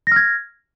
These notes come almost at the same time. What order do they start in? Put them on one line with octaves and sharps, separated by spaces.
A#6 F6 G#6